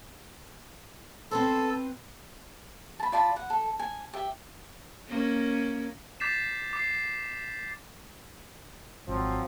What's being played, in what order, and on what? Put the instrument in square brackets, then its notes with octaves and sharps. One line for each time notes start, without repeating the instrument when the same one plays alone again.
[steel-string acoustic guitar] C4 B4 C5 [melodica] A4
[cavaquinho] A5 B5
F4 D5 A5 B5
F#5
A4
G#5
G4 E5
[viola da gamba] A#3 C#4
[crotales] D6 G6 A6 B6 C7 E7
D6 C7
[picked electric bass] G#1 [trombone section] F3 F#3 C4